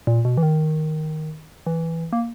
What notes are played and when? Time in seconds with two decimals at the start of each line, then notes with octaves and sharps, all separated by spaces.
0.07 A#2
0.25 B2
0.37 E3
0.43 D#3
1.66 E3
2.12 A#3